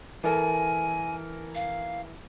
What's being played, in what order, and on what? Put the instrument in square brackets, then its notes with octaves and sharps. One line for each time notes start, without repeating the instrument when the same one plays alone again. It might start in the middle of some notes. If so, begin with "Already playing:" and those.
[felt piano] E3 A4 A#4 [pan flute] G#5
[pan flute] F5